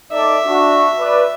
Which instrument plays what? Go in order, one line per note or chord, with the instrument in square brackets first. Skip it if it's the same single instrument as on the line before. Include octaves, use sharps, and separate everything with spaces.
[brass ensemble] D#4 A4 D5 [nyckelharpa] E5
[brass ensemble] D4 F#4
B4 D5